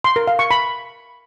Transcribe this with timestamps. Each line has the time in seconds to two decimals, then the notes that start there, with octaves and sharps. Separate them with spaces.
0.04 C6
0.16 A#4
0.28 F5
0.39 C#6
0.51 B5